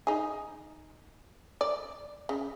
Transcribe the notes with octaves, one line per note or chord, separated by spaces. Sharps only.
D#4 G#4
D5
C#3